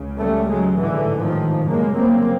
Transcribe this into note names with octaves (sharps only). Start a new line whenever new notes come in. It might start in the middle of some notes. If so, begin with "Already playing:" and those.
Already playing: C#2 C#3
G3 A3
F#3 G#3
A1 G#2 D3 E3
D#3 F3
G1 F#2 C#3 G#3 A#3
A#3 C4